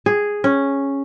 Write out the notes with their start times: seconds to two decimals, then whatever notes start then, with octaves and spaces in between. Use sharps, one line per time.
0.06 G#4
0.44 C#4